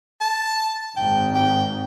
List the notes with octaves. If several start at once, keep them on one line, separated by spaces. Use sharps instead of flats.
A5
G#1 G#2 G5
G5